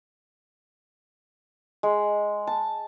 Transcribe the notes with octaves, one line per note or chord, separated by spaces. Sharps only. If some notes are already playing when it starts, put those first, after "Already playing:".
G#3
A5